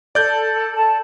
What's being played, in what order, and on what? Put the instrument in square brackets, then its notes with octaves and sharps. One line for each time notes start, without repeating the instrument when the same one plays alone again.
[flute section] A4 [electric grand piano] D5 G6
[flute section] A4 A5